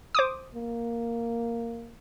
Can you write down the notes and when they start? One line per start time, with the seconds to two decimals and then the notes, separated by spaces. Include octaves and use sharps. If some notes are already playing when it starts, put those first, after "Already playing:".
0.15 C5 D6 D#6
0.55 A#3